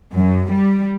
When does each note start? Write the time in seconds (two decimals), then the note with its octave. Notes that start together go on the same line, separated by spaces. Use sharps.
0.15 F#2
0.52 G3